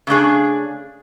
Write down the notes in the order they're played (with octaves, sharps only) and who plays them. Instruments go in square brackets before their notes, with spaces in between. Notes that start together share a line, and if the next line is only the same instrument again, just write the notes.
[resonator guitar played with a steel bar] C#3 A3 D4 G#4